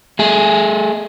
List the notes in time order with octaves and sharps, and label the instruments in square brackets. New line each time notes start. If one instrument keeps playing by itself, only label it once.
[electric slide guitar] A3 G#4